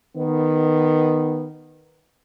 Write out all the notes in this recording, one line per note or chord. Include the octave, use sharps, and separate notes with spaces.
D#3 B3